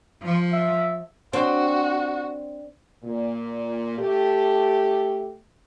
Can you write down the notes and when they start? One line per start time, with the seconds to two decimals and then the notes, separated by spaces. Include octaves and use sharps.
0.23 F3
0.53 E5
1.33 C4 D4 F#4
3.04 A#2
3.98 A3 G4